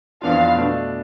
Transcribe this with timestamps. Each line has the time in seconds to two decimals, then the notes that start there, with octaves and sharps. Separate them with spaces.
0.22 F2 E3 B3 D4 F4 F5
0.55 B2 A3 D4